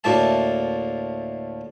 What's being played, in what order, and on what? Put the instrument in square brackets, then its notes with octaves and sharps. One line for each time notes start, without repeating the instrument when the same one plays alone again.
[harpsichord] D2 A2 A#3 E5 A5